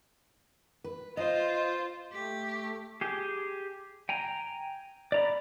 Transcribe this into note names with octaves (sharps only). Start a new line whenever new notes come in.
B4
F4 C5 D#5
A3 G4
G4 G#4
G5 G#5 A#5
D5 A#5 B5